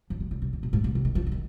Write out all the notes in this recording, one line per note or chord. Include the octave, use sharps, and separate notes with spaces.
F3
D#3
C#3
C3
A#2
A#2
G#2
A#2
C3
D#3
F3
F#3
D#3